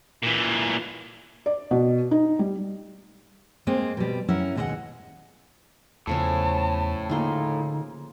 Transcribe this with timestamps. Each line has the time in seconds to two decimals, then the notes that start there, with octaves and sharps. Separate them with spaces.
0.23 A#2 E3
1.46 D5
1.71 B2
2.11 D#4
2.39 G3
3.67 G#3 A#3 C4
3.97 B2 G3
4.28 F#2 C#4 E4 A#4 F#5
4.55 D#2 B2 G#3 E4 D#5 F#5
6.07 E2 A2 C#3 F3 C#4 A5
7.10 D3 A#3 D#4 F4 G#4